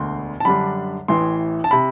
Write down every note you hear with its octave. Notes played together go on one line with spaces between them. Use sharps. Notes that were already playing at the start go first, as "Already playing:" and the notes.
Already playing: E1 D2 D3 C6
A5
F#2 D3 G3 D4 B5
A1 A2 E3 C6
A5
C3 B5